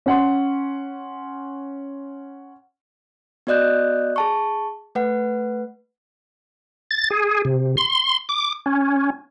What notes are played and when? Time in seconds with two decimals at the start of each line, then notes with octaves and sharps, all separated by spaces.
0.06 C#4 F#5 C6
3.47 B3 F#4 D5 D#5 F#6 G6
4.16 G#4 A5 C#6
4.95 A3 B4 F#5
6.91 A6
7.10 G#4
7.45 C3
7.77 C6
8.29 D6
8.66 C#4